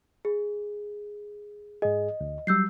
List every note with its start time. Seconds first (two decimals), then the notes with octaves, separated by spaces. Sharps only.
0.25 G#4
1.82 G#2 G#4 D#5
2.21 D2
2.47 F#3 G3 E6 G6 C7